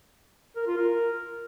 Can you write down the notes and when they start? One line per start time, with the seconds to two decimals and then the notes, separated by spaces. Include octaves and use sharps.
0.56 A#4
0.67 F4
0.78 A#4